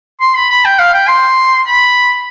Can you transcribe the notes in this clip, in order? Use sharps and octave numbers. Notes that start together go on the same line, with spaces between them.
C6
B5
B5
G5
F5
G5
C6
B5